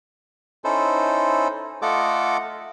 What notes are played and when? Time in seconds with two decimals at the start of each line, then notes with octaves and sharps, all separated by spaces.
0.64 C#4 D#4 E4 A4 C5
1.82 A3 F4 A4 D#5 F#5 D6